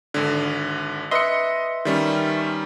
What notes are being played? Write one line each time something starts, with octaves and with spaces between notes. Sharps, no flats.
G#1 D3
B4 D#5 E5 C6 C#7
D#3 G3 C#4